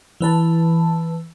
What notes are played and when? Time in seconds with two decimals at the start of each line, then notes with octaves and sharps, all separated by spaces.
0.21 E3 B4 A5